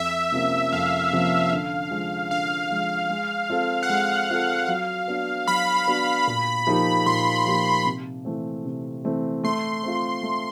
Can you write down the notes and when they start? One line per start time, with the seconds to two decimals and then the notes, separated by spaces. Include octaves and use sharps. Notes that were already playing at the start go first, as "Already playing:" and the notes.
Already playing: F2 E5
0.32 C3 F3 A#3 C#4
0.72 F2 F5
1.12 C3 F3 A#3 C#4
1.52 D3
1.91 F3 G#3
2.30 D3 F5
2.71 F3 G#3
3.09 G#3
3.50 C4 F4 A4
3.83 F#5
3.89 G#3 F5
4.29 C4 F4 A4
4.68 F#3
5.08 B3 D4 F#4
5.47 F#3 B5
5.87 B3 D4 F#4
6.27 A#2
6.67 F3 A#3 D#4 G4
7.06 A#2 C6
7.46 F3 A#3 D#4 G4
7.85 C3
8.25 E3 A3 C4
8.65 C3
9.04 E3 A3 C4
9.44 A3 C6
9.83 C4 F4
10.23 A3